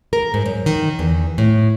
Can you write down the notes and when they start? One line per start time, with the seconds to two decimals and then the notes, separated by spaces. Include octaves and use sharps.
0.13 A#4
0.34 G#2
0.46 F#2
0.66 D#3
0.99 E2
1.38 A2